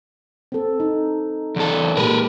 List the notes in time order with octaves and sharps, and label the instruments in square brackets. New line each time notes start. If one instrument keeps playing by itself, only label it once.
[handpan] C4 A4
D#4
[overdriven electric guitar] E2 A4
[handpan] A#2 G#3 G4 [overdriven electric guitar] A#4 B4